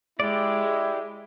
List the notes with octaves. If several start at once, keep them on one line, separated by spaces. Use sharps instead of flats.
G#3 E4 G4 D5